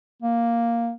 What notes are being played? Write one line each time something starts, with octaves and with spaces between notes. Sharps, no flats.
A#3